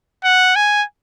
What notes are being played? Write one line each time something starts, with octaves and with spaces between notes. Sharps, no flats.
F#5
G#5